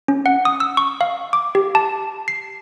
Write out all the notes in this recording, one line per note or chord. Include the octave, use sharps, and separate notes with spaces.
C#4
F#5
D#6
E6
C#6
F5
D6
G4
A5
C7